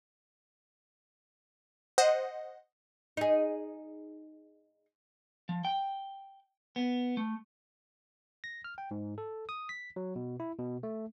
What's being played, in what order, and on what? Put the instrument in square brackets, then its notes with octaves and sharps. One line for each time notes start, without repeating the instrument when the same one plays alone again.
[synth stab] C5 D#5 F#5
[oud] D#4 G#4
[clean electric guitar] F3
G5
B3
A3
[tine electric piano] A#6
F6
G5
G#2
A4
D#6
B6
F#3
B2
E4
B2
A3